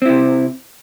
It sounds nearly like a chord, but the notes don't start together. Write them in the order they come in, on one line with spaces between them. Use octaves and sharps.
C4 E4 C3